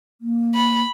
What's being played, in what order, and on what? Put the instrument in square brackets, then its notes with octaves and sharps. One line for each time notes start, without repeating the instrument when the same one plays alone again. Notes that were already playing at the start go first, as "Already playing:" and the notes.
[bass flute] A#3
[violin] B5